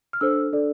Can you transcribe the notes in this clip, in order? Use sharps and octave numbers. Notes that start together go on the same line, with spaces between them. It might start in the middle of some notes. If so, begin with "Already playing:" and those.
F6
D4 A4 C5 E6
D4 A4 D5